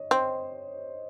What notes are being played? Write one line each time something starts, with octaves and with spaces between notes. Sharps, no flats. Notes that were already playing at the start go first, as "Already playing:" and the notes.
Already playing: C#5 D#5
C4 C5